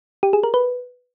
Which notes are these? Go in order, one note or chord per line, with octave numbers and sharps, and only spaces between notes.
G4
G#4
A#4
B4